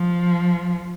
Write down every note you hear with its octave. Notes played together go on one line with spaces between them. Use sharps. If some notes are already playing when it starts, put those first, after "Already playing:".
Already playing: F3